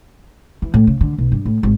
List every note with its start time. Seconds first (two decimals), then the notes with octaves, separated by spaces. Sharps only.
0.62 E3
0.74 A2
0.87 C#3
1.01 D3
1.18 B1
1.32 G2
1.45 A2
1.63 G#1